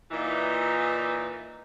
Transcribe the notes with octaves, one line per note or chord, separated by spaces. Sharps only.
A#2 E3 D#4